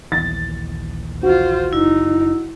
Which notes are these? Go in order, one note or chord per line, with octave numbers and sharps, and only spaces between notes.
A#1 D#2 E3 A6
F4 F#4 C5
F#1 D#4 E4